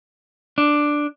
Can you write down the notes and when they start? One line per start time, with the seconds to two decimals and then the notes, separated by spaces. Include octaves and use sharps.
0.58 D4